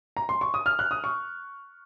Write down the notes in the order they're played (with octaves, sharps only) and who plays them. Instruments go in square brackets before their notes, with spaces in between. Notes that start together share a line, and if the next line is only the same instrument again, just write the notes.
[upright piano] A#5
C6
C#6
D#6
F6
F#6
D#6
C#6